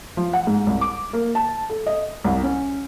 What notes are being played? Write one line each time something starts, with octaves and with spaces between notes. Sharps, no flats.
F3
F#5
G#2
C2
D6
A#3
A5
A4
D#5
C2
C#4